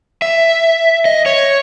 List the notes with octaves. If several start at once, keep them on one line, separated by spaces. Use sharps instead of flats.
E5
D#5
C#5